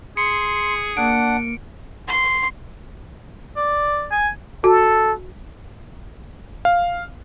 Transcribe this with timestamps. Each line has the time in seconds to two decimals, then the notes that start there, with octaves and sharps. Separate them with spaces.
0.17 G#4 C6 C#7
0.97 A#3 D4 F#5 D7
2.08 C6
3.56 D5
4.11 G#5
4.64 F#4 A4
6.65 F5